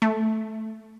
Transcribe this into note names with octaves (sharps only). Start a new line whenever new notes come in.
A3